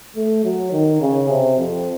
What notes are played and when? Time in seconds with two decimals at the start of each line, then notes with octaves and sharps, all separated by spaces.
0.16 A3
0.44 F#3
0.72 D#3
1.01 C#3
1.29 C3
1.58 F2